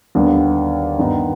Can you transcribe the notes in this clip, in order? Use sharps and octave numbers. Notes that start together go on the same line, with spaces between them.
D#2 D3 G3 B3 D4
G2 D#3 B3 D#4